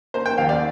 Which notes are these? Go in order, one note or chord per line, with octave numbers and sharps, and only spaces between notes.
A#3 C5
G5
D#2 F5
D5